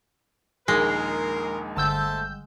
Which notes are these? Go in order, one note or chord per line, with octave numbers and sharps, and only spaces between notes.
A#1 D#2 G#3 G#4 A#4 C7
G1 A3 C5 A5 E6 G6